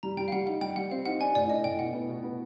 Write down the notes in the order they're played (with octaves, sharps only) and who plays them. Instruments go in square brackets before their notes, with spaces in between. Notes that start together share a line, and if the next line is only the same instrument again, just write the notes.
[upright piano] G3 [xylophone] A#5
[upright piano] G3 [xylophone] G5
[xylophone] F5
[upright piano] G3 [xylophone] F#5
[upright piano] D#4 [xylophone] F#5
[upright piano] G3 [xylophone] G5
[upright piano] G3 [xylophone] F#5
[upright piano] C4 [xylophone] F5
[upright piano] D#4 [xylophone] F#5
[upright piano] D4 [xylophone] G#5
[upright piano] A2 [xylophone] D5
[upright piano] D4 [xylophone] D#5
[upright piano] A2 [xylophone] G5
[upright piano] B2 [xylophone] F#5
[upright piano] B3
B2
B3